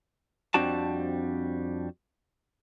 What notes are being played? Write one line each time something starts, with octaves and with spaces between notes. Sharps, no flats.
F2 G3 C4 D4 F#4 A5